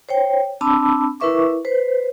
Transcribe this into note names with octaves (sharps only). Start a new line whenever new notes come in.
C5 C#5 G5
C4 D4 A5 B5 D6 E6
E4 A#4 B4 E5 C#6 D6
B4 C5